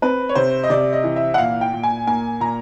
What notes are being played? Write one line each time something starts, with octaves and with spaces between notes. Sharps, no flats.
C4 B4
C#5
C3 C5
D#5
C3 D5
D#5
E3
E5
F#5
A#2 F5
G5
A#2
G#5
A#3 G#5
A#2 A#5